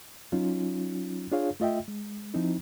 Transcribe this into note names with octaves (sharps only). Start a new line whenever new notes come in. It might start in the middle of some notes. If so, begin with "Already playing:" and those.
F#3 C#4 D#4 F4
D4 F4 G#4 C#5 F5
A3 F4 D#5 E5 G5
G#3
F3 C4 D#4 E4